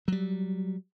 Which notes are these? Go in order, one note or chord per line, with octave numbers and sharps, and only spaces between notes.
F#3 G3